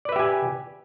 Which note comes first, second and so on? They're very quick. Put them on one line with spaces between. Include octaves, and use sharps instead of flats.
D5 B4 E5 G4 G#5